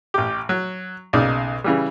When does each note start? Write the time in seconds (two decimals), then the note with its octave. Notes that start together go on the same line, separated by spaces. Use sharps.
0.14 A1 G4
0.49 F#3
1.13 B1 C#3 A#3 D#4 D5
1.64 C#3 E3 G3